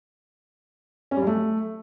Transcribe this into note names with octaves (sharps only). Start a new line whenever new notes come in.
C#4
G3
F#3
A3